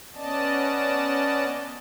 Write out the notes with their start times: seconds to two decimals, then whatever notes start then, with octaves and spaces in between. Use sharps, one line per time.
0.15 B3 C#4 D5 D#5 A5